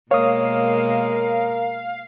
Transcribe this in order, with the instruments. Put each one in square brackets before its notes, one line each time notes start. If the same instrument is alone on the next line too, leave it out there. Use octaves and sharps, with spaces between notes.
[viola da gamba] B2 G#3 A#3 [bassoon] A#4 [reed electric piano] C#5 D#6 [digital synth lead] F5